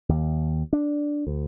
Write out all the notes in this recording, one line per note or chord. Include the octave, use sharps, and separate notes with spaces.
D#2
D4
D2